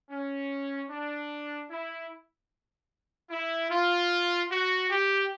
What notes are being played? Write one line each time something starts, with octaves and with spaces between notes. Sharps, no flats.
C#4
D4
E4
E4
F4
F#4
G4